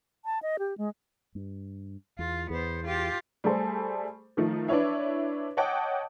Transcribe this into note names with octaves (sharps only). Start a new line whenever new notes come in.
A5
D#5
G4
G#3
G2
E2 F4
E2 B3 C5
F4 G4
G3 A3 G#4 A4 C5
D#3 F3 A3 D#4
D4 E4 B4 C#5 E5
C#5 D#5 F#5 G5 A5 D6